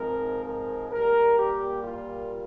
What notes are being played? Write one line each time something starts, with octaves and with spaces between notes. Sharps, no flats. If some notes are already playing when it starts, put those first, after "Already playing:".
Already playing: G#2 F3 G#3 C4 A#4
A#4
A#2 G3 A#3 A#4
G4
F4